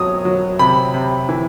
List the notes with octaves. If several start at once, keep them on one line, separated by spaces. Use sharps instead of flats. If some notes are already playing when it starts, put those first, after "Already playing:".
Already playing: B2 F#3 D#6
F#3
C3 B5
C3
E3